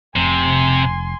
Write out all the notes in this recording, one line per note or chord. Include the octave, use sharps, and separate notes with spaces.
F1 C3 G#5 C6